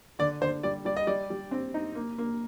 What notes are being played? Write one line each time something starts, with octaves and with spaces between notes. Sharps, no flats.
D3 D5
D3 C5
G3 D5
G3 D5
D#5
G3 D5
G3
C4
D#4
A#3
A#3